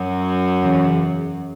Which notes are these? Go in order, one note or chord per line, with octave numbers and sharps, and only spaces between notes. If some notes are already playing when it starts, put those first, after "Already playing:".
Already playing: F#2 F#3
E2 C#3 E3